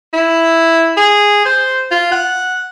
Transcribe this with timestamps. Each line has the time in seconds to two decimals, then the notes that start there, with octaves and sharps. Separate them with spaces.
0.13 E4
0.97 G#4
1.46 C5
1.91 F4
2.12 F#5